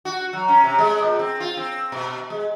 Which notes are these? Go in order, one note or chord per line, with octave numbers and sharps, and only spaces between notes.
F#4
F#3
C#4
C3
G#3
A#2
C4
F4
C4
B2
G#3